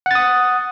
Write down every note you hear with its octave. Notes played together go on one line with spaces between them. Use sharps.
F#5 D#6 A6